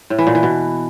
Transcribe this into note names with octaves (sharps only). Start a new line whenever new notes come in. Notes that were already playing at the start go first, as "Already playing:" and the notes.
A2
E3
A#2
E3
B2